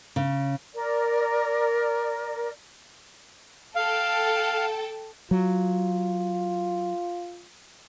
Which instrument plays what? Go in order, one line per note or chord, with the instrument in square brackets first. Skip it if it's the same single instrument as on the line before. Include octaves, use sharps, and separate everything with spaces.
[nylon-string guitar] C#3
[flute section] A#4 D5
[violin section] A4 G5 A5 [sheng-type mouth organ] F5
[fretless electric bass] F#3 [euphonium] F4